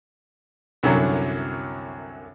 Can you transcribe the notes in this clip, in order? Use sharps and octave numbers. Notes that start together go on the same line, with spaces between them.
C2 F#2 D3 F#3